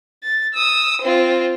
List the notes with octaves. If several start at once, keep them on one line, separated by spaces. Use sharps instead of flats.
A6
D#6 E6
C4 F4